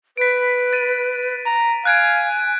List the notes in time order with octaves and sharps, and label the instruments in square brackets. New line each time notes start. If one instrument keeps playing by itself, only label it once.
[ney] B4 [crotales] B6 D7
[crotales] A6 D#7
[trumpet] A#5
[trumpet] F5 [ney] G#5 [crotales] F#6 G#6 D7